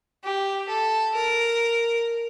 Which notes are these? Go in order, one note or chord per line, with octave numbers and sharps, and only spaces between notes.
G4
A4
A#4